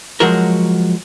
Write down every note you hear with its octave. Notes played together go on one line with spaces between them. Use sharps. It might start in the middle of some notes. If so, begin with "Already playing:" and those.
F3 F#3 G#3 F#4 A#4